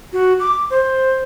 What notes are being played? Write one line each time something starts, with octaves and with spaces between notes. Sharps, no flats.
F#4
D6
C5